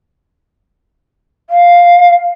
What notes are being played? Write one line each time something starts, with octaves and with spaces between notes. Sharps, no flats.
F5